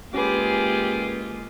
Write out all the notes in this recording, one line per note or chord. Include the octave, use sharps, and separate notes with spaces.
G#3 A#3 C#4 F4 G4 G#4 B4 D6